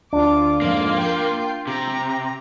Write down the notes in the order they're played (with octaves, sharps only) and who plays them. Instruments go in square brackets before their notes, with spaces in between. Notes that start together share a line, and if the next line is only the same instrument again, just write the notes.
[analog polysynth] D2 D3 F4 [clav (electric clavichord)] D4 [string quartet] D6
[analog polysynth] F2 G#2 F3 [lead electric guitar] A#3 [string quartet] F4
[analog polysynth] G5 C6 G6
[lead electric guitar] C3 [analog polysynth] G4 [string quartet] A#5